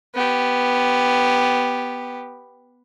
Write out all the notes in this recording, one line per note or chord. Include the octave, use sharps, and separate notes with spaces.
B3 G4